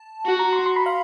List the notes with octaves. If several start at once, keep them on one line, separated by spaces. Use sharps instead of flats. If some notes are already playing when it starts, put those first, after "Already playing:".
Already playing: A5
F#4
A#5
C6
C6
B5
F5